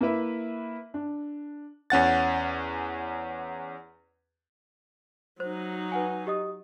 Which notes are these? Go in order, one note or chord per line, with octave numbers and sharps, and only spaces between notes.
A#3 E4 B4 E5
D4
E2 C#4 F#5 A6
F#3 D#4 C5
B4 F#5 G#5
G4 D#5 D#6